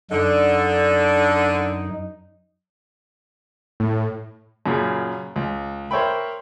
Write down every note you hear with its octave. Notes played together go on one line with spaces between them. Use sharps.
F#2 D3 D#4
A2
F#2 A#2 C#3
C#2
A#4 C5 C#5 E5 G5 B5